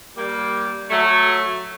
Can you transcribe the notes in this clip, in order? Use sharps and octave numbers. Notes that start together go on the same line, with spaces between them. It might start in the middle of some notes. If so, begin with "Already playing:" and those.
G3 A#3
F#3 A3